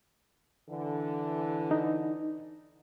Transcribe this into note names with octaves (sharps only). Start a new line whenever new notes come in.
D3 E3
D#4